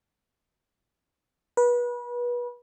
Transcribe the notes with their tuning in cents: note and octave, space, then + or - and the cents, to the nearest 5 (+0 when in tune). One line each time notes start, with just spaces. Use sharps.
B4 -30